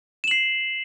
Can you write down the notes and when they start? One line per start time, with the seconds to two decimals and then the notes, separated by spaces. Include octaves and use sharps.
0.24 E7
0.28 F#7
0.31 C7